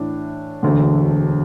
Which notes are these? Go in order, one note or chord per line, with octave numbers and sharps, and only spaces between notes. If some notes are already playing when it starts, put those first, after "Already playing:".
Already playing: A2 E3 D4
E1 D2 D3